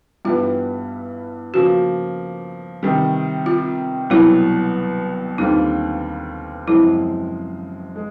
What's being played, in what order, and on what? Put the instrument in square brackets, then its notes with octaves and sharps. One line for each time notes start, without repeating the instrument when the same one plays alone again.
[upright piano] G2 E3 G3 B3 [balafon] F4
[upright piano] C#3 F3 A#3 [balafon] F#4
[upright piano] C3 D#3 G3
[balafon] F4
[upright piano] C2 B2 F#3 [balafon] E4
[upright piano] D#2 D3 G3 C4 F4 [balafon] D#4
[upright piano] F#2 C#3 F3 G#3 C4 [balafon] E4
[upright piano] G#3